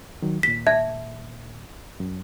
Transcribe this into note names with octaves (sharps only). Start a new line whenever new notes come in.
D#3 F#3
D#2 A#2 B6
E5 A5 G#6
F#2